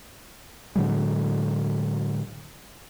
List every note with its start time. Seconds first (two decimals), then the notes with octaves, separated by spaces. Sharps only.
0.75 A2 D3 F#3 G#3